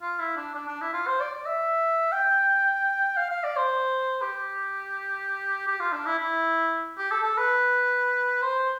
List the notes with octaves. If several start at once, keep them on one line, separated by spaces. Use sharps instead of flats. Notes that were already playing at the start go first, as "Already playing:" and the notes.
F4
E4
D4
D4
D4
E4
F4
C5
D5
D5
E5
G5
F5
F5
D5
C5
G4
G4
F4
D4
E4
E4
G4
A4
A4
B4
C5